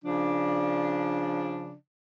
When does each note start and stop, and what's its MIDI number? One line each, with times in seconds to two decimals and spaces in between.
0.04 1.73 49
0.04 1.73 53
0.04 1.73 62